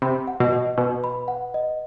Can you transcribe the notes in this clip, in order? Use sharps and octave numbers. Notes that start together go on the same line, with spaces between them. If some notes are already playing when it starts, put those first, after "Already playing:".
C3 B5
F#5
B2
D#5
B2 B4
B5
F#5
D#5